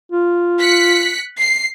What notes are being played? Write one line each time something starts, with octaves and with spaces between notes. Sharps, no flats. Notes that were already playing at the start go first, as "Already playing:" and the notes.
F4
F#6 B6 C#7
C7